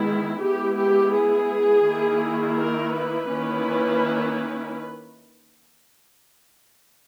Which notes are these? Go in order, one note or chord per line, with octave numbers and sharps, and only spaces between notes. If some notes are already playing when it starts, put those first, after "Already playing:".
Already playing: D#3 G#3 B3 E4
G#3 B3 E4 G4
G4
G#4
D#3 A#3 E4
A#4
B4
D#3 A#3 C#4 E4